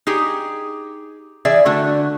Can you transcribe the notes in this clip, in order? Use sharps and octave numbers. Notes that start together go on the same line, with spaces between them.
D#4 G4 G#4
E3 G#4 D5 E5
D3 A3 F#4